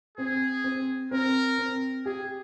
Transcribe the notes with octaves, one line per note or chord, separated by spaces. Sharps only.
C4 G#4
C4
C4 A#4
C4
G4 G#4